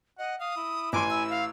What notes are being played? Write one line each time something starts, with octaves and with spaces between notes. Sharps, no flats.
D#5 F#5
F5 D#6
E4
A1 E3 G#5 C6 D6
E4 E6
F5